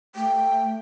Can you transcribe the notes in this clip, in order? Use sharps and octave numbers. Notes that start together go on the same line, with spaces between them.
A3 G5